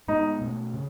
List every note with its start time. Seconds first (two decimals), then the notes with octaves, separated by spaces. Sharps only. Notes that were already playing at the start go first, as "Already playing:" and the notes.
0.08 A2 G#3 B3 D#4
0.41 B2 A3 C#4
0.74 C#3 C#4